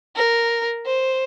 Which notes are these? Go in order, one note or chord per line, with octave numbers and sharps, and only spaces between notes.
A#4
C5